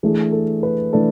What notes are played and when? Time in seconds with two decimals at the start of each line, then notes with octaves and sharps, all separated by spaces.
0.03 E3 A3 D4 G#4
0.32 A4
0.63 B4
0.93 E3 A3 D4 A4